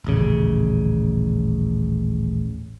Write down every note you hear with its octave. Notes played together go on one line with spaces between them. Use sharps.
D#1 A1 C#3